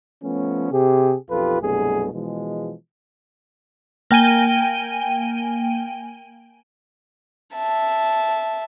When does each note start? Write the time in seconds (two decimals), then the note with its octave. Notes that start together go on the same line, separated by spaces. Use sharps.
0.22 F3 A3 B3 C#4
0.71 C3 G4 G#4
1.30 B1 F2 F4 G4 A4 B4
1.61 C2 G2 B2 F#3 A3 G#4
2.13 B2 E3 F3 G#3
4.11 A#3 G5 G#5 D#7 G7
7.54 E5 A5